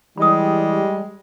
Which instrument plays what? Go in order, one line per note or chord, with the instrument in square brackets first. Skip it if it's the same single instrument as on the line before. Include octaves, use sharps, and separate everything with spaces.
[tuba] E3 [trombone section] G3 [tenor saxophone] G#3 [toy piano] B5 D#6